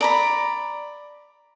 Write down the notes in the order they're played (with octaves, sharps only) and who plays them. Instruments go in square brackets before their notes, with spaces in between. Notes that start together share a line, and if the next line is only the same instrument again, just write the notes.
[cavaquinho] D5 A#5 B5